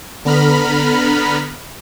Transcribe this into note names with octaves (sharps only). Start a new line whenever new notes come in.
D3 B3 A#5 B5 F6